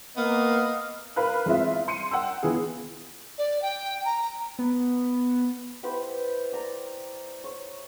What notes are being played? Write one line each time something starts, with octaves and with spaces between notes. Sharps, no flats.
A#3 B3 D#5 F5
A#4 B4 F5 F#6
E2 G#3 C4 F4 E5
C6 C#7 D#7
F#5 G5 E6
E3 B3 F4 G#4
D5
G5
A#5
B3
E4 G4 B4 C5
D5 A#5
C#5